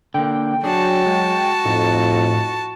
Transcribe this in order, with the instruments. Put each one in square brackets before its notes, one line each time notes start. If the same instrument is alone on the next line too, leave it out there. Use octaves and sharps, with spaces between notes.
[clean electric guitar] D3 A#3 [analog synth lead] G5
[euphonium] F#3 [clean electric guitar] D4 G#4 [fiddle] F#4 A5
[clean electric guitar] G#3
[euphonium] F2 [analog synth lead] A2 [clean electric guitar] D#4